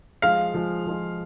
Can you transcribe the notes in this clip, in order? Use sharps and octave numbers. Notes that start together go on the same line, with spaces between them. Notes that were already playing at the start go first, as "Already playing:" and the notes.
F3 G#3 F4 G#4 F5
F3 G#3 F4 G#4
F3 G#3 F4 G#4